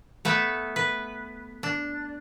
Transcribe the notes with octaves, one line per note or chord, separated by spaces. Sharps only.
A3 B3 B4 E5
B4
D4